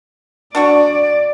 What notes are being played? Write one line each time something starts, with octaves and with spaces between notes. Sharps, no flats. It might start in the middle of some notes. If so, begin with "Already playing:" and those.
D4 F#4 D5 C#6